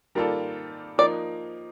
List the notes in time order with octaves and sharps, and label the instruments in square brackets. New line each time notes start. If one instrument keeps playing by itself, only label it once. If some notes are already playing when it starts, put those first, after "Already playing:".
[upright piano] D#3 G3 A#3 F4 A4
[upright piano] F3 A#3 D#4 [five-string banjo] D5